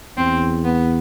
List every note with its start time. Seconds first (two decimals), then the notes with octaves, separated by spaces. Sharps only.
0.17 E2 C4
0.65 B3